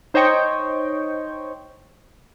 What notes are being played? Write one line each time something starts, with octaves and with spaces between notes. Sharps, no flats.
D#4 C5 C#5 D#5 G5 C#6